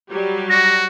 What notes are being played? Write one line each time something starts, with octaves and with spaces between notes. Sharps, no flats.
F#3 G3 G4
F#4 A#6